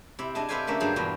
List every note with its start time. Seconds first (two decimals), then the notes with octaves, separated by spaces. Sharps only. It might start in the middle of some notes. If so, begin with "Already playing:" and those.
0.19 C3 E4
0.35 D4 G#4 D#5 A5
0.49 C3 A4 B4 C5 F5 G#5
0.67 D3 A3 A#3 C#4 E5 B5
0.80 G2 F#3 D4 G#4 C5
0.96 E2 G2 B2 F4